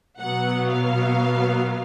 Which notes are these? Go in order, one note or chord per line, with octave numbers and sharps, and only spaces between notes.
B2 F#3 B3 F#5
F5